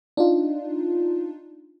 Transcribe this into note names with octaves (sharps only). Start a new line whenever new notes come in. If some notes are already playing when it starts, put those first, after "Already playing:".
D4 D#4 F4